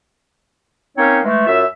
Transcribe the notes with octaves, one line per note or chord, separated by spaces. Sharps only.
A#3 C4 C#4 D#4 C#5
E3 G#3 A3
F#2 F4 E5